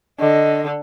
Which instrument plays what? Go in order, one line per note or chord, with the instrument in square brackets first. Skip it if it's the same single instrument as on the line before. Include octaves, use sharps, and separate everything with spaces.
[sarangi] D3 [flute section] D#5